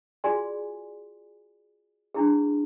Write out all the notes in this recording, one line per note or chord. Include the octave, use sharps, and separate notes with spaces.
F4 F#4 G#4 D5 G#5 C6
D4 E4 G#4